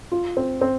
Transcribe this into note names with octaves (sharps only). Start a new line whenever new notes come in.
F4
C4
C4